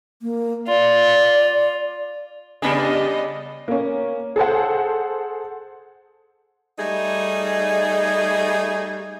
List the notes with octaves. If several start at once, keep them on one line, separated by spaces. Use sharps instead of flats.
A#3
F4 D5
C#3 G3 B3 D4 G#4 D5 D#5
A#3 C#4
G#4 A4 C5 F#5
G3 A3 D#4 G#4